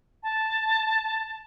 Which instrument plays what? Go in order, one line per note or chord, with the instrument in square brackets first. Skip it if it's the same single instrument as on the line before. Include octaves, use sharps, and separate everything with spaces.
[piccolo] A5